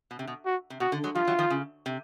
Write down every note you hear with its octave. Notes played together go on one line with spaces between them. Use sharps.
B2
C3
B2
F#4
C3
B2 F#4
D3
F#3 G#3
F3 G3 F4
E3 F#3
D#3 F3
C#3
C3